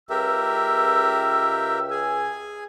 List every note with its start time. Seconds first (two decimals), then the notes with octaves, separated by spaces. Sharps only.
0.10 C#2 G4 A#4 E5 E6
1.91 G#4 G#5